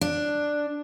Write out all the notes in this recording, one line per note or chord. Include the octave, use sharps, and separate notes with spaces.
D4